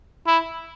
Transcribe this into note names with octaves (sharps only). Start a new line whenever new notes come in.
E4